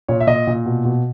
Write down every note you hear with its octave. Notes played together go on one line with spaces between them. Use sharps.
A#2 C#5
E5
A#2 D#5
A#2
B2
B2